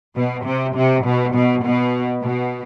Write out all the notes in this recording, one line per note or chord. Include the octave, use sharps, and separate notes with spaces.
B2
C3
C3
B2
B2
B2
B2